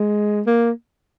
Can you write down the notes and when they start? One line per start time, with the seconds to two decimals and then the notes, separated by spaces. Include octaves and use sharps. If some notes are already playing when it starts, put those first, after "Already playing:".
Already playing: G#3
0.47 A#3